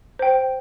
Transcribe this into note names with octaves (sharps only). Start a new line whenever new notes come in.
C5 G5